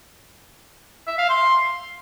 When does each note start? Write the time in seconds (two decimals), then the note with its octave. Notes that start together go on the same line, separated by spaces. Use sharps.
1.07 E5
1.18 F5
1.30 C6